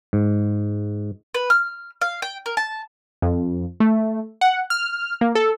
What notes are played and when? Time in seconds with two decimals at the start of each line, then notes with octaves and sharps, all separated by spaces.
0.13 G#2
1.34 B4
1.50 F6
2.01 F5
2.22 G5
2.46 A#4
2.57 A5
3.22 F2
3.80 A3
4.41 F#5
4.70 F6
5.21 A#3
5.35 A4